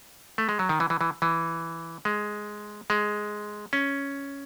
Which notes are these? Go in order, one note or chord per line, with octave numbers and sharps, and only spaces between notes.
A3
G#3
F#3
D#3
E3
E3
E3
E3
G#3
G#3
C#4